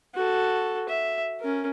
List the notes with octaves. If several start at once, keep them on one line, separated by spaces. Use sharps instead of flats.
F#4 A4
E5
C#4 A#4